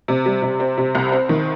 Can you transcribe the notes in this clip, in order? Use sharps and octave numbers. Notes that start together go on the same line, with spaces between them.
C3
G3
C3
C4
C3
C2
C4
D#3